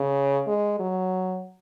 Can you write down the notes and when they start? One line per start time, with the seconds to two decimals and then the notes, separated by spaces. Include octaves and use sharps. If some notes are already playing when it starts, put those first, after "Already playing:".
Already playing: C#3
0.47 G#3
0.80 F#3